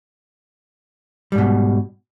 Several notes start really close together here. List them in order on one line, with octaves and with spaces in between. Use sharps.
G3 G#2 B2